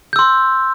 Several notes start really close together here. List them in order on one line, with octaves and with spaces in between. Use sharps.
G6 E6 C6